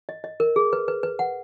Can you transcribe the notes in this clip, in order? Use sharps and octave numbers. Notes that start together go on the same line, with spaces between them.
D#5
D#5
A#4
G#4
B4
B4
B4
F#5